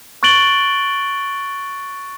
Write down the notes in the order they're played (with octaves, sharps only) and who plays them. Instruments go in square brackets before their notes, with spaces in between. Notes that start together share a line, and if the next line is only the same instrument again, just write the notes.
[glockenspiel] C#6 F#6 A6 D7 F#7 G7